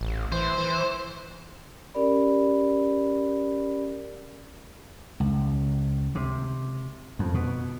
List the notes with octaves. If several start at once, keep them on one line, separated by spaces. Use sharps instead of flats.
A1
E3 C5
E3
C#4 G4 A#4 D5 B5
C#2
C3
F2
B2